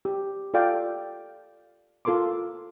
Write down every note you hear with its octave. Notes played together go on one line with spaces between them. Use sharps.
G4
F4 A4 D5 F5 G5 D6
F4 A4 A#4 C6 D6